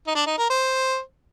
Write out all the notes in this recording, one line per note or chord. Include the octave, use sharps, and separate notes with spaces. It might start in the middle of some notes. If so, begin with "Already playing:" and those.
D#4
D4
D#4
A#4
C5